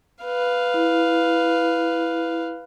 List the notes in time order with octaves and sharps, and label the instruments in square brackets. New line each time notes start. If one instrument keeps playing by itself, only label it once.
[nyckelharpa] B4 F5
[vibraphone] E4